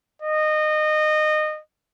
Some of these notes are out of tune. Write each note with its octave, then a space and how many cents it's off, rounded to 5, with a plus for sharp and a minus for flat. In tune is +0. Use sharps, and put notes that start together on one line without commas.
D#5 -25